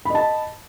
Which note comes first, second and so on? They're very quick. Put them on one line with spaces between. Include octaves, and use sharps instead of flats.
B5 D#5 A5